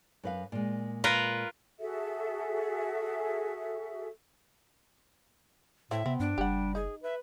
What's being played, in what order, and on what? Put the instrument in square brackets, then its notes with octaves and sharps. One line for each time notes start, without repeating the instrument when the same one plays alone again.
[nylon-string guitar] F#2 B4 F5
A#2 G#3
[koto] F4 A#4 B4
[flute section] F#4 G#4 A4 E5
[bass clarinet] A2 [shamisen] A3 C4 [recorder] E5
[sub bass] C3 [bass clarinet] B3 [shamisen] C4
[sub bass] G2 [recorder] D4
[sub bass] F#1 [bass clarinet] G3 [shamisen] G4 F#5
[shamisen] D#4 [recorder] G#4
[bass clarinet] B4 [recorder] E5